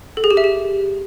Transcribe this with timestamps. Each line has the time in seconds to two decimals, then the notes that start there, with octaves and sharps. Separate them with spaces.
0.17 A4
0.24 G#4
0.31 G4
0.37 E5
0.44 G4